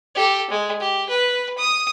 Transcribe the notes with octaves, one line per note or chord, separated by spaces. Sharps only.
G4 A4
G#3
G4
B4
D#6